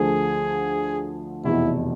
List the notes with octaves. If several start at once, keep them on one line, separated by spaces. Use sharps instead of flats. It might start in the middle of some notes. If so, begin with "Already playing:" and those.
Already playing: D2 D3 F3 A3 G#4
F1 E2 B2 E4